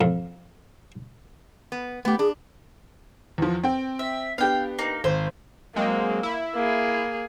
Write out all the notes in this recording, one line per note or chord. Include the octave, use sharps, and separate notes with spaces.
F2
B3
A3 B3 G4
D4 G#4
E2 F3
C4 G5
E5
B3 D4 G4 F5 G5
A#3 D#4
G#1 C5
F#3 G#3 A#3 C4
E4
A#3 G#4